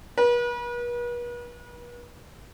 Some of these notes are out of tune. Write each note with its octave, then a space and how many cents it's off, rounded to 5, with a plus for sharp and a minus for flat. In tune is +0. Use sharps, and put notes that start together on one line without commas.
B4 -40